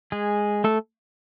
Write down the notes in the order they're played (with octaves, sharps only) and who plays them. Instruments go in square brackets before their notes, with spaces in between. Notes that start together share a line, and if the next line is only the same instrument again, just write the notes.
[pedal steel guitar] G#3 G#4
A3 A4